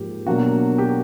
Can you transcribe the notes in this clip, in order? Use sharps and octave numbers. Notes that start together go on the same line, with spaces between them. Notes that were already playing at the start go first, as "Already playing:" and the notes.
Already playing: G#2 F3 A#3 G4
B2 F#3 A#3 D4 F#4
G4